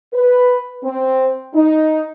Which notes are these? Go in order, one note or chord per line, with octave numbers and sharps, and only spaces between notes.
B4
C4
D#4